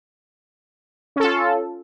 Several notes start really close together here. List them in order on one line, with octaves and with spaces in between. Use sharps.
C#4 A4 F4